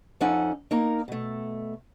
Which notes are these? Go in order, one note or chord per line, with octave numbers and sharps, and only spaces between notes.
F2 F3 C#4 D#4 A4 F#5
A#3 D#4 A#4 A#5
B2 A3